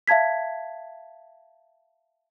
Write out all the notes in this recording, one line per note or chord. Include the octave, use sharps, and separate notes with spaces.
E5 F5 A5 G#6 B6